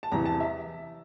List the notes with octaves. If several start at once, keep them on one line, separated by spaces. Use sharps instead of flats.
A5
E2 C3 E3 A#5
A5
E5